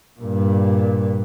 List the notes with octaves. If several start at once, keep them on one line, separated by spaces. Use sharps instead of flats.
G2 A#2